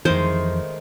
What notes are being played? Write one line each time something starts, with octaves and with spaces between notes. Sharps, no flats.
F2 D#3 E3 G#3 A3 C5